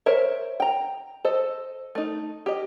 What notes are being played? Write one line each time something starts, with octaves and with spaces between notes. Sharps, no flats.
A#4 C5 C#5 E5
G5 A#5
A4 C5 D#5
A3 D#4
G4 D#5